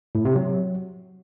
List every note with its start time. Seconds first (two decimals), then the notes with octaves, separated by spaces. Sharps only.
0.15 A2
0.25 C3
0.35 F#3